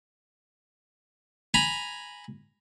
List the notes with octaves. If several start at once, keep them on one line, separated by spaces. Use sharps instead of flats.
G#5 A#5 B5